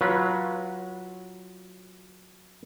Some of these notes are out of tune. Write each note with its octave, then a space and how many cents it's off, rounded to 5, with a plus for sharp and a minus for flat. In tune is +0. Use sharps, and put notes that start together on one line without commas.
F#3 +0 F4 +0 B4 -25